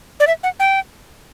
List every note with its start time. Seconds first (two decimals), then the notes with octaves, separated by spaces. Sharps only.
0.20 D5
0.27 E5
0.43 F#5
0.60 G5